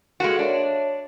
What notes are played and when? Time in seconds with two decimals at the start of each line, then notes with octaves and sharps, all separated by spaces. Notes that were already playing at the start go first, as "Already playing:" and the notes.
0.20 G#3 A#3 F#4 A4 A#4
0.39 D4 C#5 D5 E5